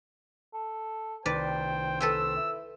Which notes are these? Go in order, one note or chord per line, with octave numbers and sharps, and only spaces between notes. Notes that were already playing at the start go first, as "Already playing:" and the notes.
A4
C2 D#3 B4 C5 D5 G5
A4 B4 G5 E6
E4